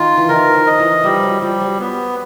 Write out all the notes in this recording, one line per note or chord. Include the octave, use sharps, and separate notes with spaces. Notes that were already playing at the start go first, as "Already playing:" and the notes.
Already playing: D#3 F4
E3
D#3 A#4
F3
D#5
E3
F3 G3
F#3
F3 G3
F#3
B3